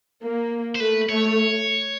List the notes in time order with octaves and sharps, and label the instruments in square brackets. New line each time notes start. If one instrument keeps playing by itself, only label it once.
[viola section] A#3
[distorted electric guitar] C5
[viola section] A3 [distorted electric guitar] B4
[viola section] A3 [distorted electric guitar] C#5